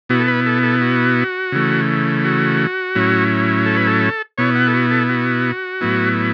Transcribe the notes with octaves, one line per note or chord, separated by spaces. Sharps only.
B2 B3 E4 F#4
A4
B4
A4
A4
F#4
C#3 E3 A3
F#4
A2 F#3 C#4 E4
A4
B4
A4
B2 B3 E4 C#5
F#5
A4
F#4
A4
F#4
A2 F#3 B3 E4